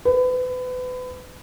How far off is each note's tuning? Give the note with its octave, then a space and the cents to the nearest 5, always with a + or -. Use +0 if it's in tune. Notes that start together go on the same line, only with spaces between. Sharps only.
B4 +30